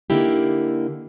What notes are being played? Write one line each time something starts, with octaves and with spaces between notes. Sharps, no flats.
D3 A#3 D#4 E4 G4